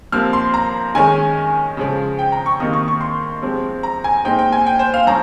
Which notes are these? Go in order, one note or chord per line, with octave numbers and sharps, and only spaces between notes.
C3 F3 A#3 F6
C6
A#5
D#3 G#3 C#4 G#5
C#3 F3 G#3
G5
A#5
C#6
C3 D#3 A#3 D#4 D#6
C#6
C#6
C6
C3 F3 G#3 C4
A#5
G#5
A#2 G#3 C4 D#4 G5
G5
G#5
G5
C5
F5
F3 C#4 A#5